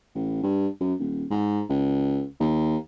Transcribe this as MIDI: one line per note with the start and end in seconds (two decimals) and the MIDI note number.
0.15 0.41 33
0.43 0.67 43
0.80 0.94 42
1.00 1.25 27
1.30 1.62 44
1.69 2.24 37
2.40 2.77 39